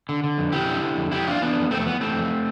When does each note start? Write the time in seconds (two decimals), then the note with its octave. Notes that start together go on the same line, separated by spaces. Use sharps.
0.09 D3
0.24 D3
0.38 F2
0.52 F2 E4 G4
0.68 D3
0.83 D3
0.97 F2
1.12 F2 E4 G4
1.27 E3 D4 F4
1.41 E3 B3 D4
1.56 F2
1.70 F2 A3 C4
1.82 C4
1.86 E3 B3
2.00 E3 A3 C4
2.15 F2